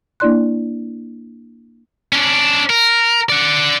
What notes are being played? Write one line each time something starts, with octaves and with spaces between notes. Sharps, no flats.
A#3 D4 E4 D5 C6 F#6
C#4 D4
A#4
D5 F#5